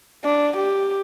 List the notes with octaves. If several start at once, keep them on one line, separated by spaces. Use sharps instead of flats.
D4
G4